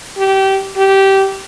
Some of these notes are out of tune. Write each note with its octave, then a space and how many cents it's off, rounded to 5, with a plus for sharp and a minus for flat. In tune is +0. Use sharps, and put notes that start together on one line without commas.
G4 -20
G4 -15